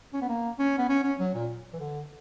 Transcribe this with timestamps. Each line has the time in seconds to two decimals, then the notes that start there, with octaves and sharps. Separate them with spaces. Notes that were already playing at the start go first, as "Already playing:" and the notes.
0.13 C#4
0.21 B3
0.29 A#3
0.59 C#4
0.78 B3
0.89 C#4
1.04 C#4
1.19 F#3
1.34 A#2
1.73 E3
1.80 D3